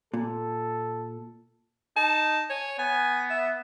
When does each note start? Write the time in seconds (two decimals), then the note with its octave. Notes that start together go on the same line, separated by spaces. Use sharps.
0.14 A#2 A4
1.97 D#4 A5
2.50 C#5 G#5
2.79 B3 G#5
3.30 E5